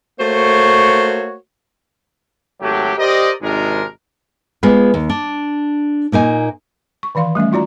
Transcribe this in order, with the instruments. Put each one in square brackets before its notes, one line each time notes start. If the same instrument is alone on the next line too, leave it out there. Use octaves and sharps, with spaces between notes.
[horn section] A3 A#3 F#4 C5 C#5
[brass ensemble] G#1 F#3 A3 G4
G4 A#4 C5 D5 D#5
G#1 C3 D#3 G#3 D4 A#4
[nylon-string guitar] G#3 B3 F4 G#4 B4
D#2
D4
A#2 A#3 D#4 G#5
[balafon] C#6
D#3 E3 D5 F5 C6
G3 A3 C#4 E5
D#4 F4 F#4 D5 A#5